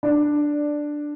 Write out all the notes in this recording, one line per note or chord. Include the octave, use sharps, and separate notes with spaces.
D4